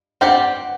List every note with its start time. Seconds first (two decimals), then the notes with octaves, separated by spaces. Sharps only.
0.21 C4 G4 D5 F#5